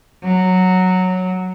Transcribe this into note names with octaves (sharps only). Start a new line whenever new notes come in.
F#3